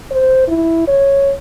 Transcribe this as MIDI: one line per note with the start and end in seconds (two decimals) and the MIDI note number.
0.11 0.47 72
0.48 0.84 64
0.88 1.32 73